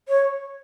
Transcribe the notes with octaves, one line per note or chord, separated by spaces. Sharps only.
C#5